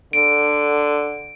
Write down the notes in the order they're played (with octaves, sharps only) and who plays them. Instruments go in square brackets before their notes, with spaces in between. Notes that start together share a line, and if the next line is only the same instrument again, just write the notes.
[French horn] D3 [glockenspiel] D7